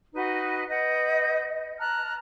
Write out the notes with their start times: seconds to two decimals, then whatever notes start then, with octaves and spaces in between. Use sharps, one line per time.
0.14 D#4 F#4 B4 D#5
0.70 B4 D#5 F#5 G6
1.79 A5 A#5 F6 F#6